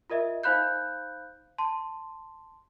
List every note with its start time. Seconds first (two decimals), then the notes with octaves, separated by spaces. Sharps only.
0.10 F4 A#4 D#5 E5
0.43 D#4 C5 F5 B5 F#6 G6
1.58 A5 C6